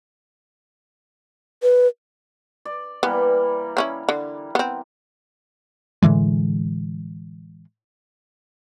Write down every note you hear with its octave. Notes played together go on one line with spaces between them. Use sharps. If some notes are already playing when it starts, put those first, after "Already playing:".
B4
D5
E3 G3 A#3 B3
C4 C#4 E4
D3
B3 C4
A2 D3 E3 G#3